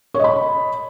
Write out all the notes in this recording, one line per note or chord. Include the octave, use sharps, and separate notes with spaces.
C#5 D#5 B5